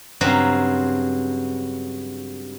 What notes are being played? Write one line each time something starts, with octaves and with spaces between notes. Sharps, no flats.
G2 C#3 F#3 C4 F5 A#5